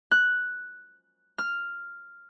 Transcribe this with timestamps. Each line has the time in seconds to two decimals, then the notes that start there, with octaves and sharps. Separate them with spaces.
0.11 F#6
1.38 F6